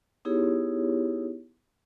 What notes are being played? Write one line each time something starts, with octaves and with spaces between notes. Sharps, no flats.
B3 D#4 E4 G4 G#4 C#5